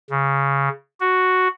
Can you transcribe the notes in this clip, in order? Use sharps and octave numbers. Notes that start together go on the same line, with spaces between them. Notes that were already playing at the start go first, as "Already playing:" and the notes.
C#3
F#4